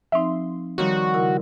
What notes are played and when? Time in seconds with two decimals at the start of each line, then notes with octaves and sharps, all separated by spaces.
0.12 F3 C4 D#4 E5 C6
0.78 D#3 F3 G3 F#4 C#5
1.14 C#3 E4 A#4